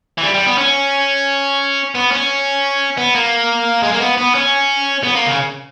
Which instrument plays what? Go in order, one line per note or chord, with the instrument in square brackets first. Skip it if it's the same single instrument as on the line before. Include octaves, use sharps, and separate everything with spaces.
[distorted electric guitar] E3
G3
G3
B3
C#4
B3
C#4
B3
A#3
G#3
A#3
B3
B3
C#4
B3
A#3
C#3